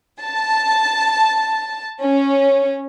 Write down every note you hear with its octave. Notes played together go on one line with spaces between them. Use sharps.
A5
C#4